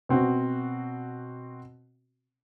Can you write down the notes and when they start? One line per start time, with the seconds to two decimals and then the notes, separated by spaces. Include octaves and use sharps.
0.09 B2 C4 F#4